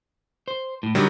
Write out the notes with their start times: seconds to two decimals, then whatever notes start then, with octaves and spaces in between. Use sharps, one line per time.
0.48 C5
0.83 A2
0.95 D3 D#3 F#3 G3